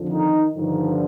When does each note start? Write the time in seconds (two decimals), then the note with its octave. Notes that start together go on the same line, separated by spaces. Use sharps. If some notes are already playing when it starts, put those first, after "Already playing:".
Already playing: F2 D3 F3
0.10 D#3 D#4
0.55 G2 D3 D#3 F3 D#4